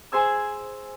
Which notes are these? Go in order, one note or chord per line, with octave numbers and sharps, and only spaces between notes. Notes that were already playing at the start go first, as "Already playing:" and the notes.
G#4 C5 G#5 E6